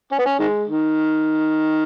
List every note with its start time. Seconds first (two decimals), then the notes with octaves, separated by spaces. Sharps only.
0.12 C#4
0.19 B3
0.26 C#4
0.39 D#3 G#3
0.68 D#3